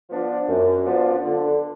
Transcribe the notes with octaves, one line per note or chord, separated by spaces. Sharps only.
F3 B3 D4 F4
F#2
F3 B3 D4 F4
D3